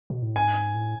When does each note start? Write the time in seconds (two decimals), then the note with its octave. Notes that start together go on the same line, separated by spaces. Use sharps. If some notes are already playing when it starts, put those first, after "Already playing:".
0.10 B2
0.22 A2
0.36 G#2 G#5
0.74 A2